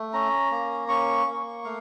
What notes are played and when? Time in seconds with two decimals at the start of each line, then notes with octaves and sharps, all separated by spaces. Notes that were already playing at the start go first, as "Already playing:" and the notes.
Already playing: A3
0.13 C#4 A#5
0.51 A#3
0.89 C#4 C#6
1.27 A#3
1.64 A3 F5